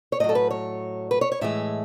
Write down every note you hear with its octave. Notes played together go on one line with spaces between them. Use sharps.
C#5
A2 F#3 D#5
A4
B4
C#5
B4
C#5
C#5
A2 E3 G#3 E5